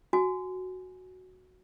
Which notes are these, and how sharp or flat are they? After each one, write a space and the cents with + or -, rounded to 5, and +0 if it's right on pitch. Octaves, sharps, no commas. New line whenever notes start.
F#4 +0 G#5 +10